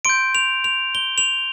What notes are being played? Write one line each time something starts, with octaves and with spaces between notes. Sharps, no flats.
C6 G6 D7
F7
F7
G7
F7